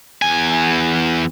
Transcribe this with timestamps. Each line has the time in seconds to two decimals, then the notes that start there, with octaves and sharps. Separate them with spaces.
0.22 E2 G#5